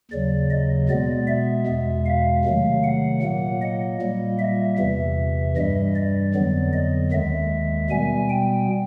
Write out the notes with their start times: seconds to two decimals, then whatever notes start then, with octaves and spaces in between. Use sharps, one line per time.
0.11 D#2 C#3 F#3 D5
0.50 D#5
0.89 B2 G#3 B3 D5
1.28 E5
1.67 E2 B2 G#3
2.06 F5
2.45 C3 D#3 F#3 A3
2.84 F#5
3.23 A#2 F#3 A#3 F#5
3.62 D#5
4.01 A#2 G3 A#3
4.39 E5
4.78 E2 C3 E3 E5
5.56 G2 E3 G3 D#5
5.95 D5
6.34 F2 D3 F#3 B3
6.73 D#5
7.12 D#2 D#3 G#3 E5
7.90 B2 G3 B3 G#5
8.30 G5